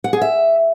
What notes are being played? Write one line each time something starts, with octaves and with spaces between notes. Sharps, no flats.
F#5
G#4
E5